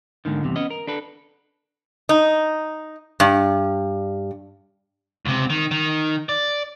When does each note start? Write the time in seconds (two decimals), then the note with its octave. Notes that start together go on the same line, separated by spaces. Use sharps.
0.25 D#2 G#2 D3 D#3
0.44 E2 G2 C3
0.56 B3 C#4 D#5
0.70 A#4
0.87 D4 A4 B4
2.09 D#4
3.20 G2
5.25 C#2 C3
5.50 D#3
5.71 D#3
6.29 D5